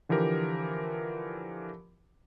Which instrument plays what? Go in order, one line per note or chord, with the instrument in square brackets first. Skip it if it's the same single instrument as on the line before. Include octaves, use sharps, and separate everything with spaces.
[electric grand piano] D3 E3 F3 G4 A#4